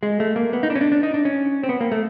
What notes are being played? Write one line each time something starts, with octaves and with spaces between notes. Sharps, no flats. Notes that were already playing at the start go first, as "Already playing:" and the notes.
G#3
A3
A#3
B3
D#4
D4
C#4
D4
D4
D#4
D4
C#4
C4
B3
A#3
A3